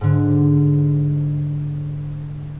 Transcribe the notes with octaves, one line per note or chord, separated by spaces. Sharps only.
G#2 D3